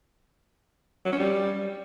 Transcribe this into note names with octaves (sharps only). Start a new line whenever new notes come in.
F#3
C#4
G3